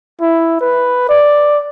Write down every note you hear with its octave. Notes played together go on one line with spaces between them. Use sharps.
E4
B4
D5